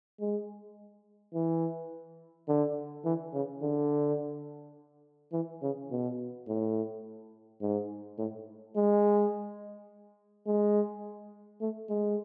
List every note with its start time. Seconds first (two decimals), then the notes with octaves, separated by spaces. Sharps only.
0.20 G#3
1.34 E3
2.48 D3
3.05 E3
3.34 C#3
3.62 D3
5.33 E3
5.62 C#3
5.91 B2
6.48 A2
7.61 G#2
8.18 A2
8.76 G#3
10.47 G#3
11.61 A3
11.89 G#3